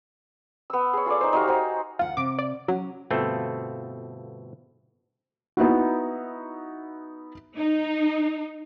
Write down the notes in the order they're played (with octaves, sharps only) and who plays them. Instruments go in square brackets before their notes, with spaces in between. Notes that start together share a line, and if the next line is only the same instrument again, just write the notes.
[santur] B3 E6
G#4 C#5
F4 G#4 A4 D5
D#4 C5
D#4 F#4 G4 F5
F#4 C5 G#5
[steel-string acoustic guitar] D2 F#5 [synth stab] F4
[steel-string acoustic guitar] C3 [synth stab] D6
[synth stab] D5
[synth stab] F#3 [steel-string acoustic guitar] C#4
[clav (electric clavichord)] G1 B2 A3 C4 F4 A4
[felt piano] B3 D#4 E4 F#4
[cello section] D#4